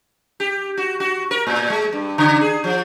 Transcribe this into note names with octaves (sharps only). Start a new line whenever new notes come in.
G4
F#4
F#4
A#4
A2
G#3
G2
C#3
G#4
F3